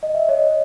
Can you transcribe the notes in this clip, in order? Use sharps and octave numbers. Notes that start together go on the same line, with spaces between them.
D#5
E5
C#5 D#5